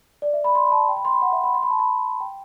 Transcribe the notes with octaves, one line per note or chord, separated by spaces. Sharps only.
D5
E5
B5
C6
B5
A5
G5
B5
C6
B5
F#5
E5
B5
C6
B5
A5
B5
G5